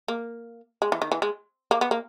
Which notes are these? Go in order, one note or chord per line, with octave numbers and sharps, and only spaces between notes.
A#3
G#3
E3
D#3
E3
G#3
A#3
B3
A#3